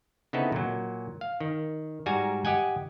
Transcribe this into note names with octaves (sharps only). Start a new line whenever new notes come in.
C#3 B3 C4 D#4 E4 A4
A#2 F#3
F5
D#3
G#2 G3 F#4 G#5 A#5
G4 D#5 F#5 G#5